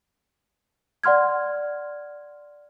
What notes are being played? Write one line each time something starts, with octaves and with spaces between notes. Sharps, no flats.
D5 F#5 C6 F6 G#6